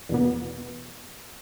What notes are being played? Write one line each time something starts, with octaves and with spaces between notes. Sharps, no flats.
E2 B2 B3